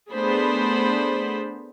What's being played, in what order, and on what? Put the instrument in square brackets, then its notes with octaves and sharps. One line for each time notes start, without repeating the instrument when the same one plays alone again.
[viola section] A3 B3 D4 G#4 C5 B5